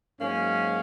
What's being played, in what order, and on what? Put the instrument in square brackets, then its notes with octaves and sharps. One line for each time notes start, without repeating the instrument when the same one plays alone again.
[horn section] G#2 F#3 A#3 C#4